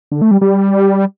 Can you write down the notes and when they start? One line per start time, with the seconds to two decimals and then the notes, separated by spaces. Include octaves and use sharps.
0.12 D3
0.22 A3
0.31 G3
0.41 G3